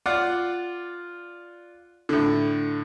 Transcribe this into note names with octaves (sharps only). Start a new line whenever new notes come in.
F4 D5 F#5
A2 D3